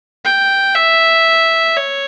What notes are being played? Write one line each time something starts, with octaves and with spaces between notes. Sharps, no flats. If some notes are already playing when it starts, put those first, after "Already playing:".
G5
E5
C#5